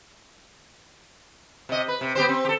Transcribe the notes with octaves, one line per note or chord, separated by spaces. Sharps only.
C3 D#5
B4
C3
B3 G4 C5
C4
G4 A4